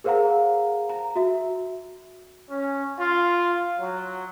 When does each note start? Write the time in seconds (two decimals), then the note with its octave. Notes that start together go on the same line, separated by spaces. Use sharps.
0.04 G#4 A#4 C5 F5 F#5 A#5
0.89 A#5
1.15 F#4 E5
2.50 C#4
2.98 F4
3.79 F#3